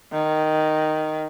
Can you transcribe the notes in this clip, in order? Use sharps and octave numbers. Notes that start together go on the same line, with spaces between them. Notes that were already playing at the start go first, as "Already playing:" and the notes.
D#3